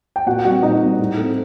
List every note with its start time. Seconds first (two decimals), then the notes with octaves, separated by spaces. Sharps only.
0.16 G5
0.26 A#2 F#4 F#5
0.39 G5
0.45 G3 C4 F#4 F#5
0.63 A#2 D#4 D#5
0.81 G3 C4
0.99 A2
1.17 A3 C4